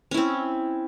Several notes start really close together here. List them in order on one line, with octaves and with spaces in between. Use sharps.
C#4 E4 C4